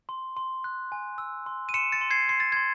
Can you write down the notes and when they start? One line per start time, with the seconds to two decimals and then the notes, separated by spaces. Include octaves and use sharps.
0.09 C6
0.37 C6
0.64 F#6
0.92 G#5
1.18 E6
1.46 C6
1.69 D#7
1.74 C6 C#7 E7
1.92 A6 C#7
2.01 C6
2.11 G#6 C7
2.29 C6 C7
2.40 A6
2.52 C6 G#6